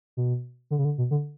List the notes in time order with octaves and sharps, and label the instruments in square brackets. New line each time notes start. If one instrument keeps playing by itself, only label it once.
[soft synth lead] B2
D3
C#3
D3
B2
D3